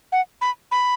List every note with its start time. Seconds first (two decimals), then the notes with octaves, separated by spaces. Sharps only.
0.12 F#5
0.41 B5
0.71 B5